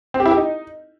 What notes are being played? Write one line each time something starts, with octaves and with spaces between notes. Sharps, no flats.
C4
G4
E4
G4
D#4